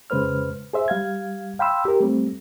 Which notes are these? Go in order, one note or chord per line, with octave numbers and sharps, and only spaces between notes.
F2 C#3 G#3 B4 C5 F6
G#4 C5 E5
G3 F5 G#6
F5 G5 B5 C6 E6
G4 A#4
G3 A3 C4